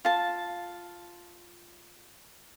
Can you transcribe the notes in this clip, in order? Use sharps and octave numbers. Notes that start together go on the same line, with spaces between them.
F4 A5